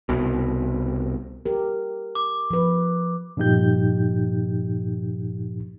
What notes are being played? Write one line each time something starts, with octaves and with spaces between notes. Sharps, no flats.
C2 B2
G4 A#4
D6
F3 B4
G2 A#2 F3 D#4 G4 G6